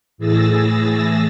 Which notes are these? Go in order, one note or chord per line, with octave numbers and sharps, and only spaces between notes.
A2 E3 G#4 E6 A6 A#6